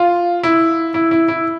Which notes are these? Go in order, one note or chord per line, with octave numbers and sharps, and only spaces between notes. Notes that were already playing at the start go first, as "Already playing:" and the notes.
Already playing: F4
E4
E4
E4
E4